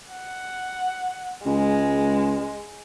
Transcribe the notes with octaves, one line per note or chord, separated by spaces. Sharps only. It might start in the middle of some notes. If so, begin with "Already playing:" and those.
F#5
C#2 G#3